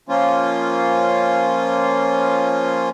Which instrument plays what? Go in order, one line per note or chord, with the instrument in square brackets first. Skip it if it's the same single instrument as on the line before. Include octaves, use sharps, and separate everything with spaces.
[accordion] F3 A#3 C#4 F4